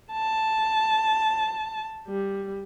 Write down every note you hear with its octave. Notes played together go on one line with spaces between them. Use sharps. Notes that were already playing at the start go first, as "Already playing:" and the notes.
A5
G3